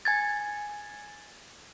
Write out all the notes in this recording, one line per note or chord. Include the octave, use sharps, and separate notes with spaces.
G#5 G#6 A6